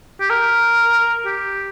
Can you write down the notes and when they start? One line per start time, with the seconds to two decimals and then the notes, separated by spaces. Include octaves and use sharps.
0.20 G4
0.30 A#4
1.26 G4